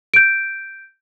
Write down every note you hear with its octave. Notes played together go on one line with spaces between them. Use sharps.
G6 D7